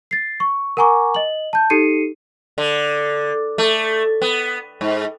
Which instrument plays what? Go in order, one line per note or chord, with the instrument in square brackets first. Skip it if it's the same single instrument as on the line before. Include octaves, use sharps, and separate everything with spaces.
[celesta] A6 C7
C#6
A#4 F#5 G#5 A#5 C#6 D6
D#5 F#7
A5 G6
D#4 G4 A4 C7 C#7 D#7
[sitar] D3
A3
B3
G#2